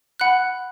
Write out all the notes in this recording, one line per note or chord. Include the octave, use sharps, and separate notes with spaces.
F#5 B5 F#6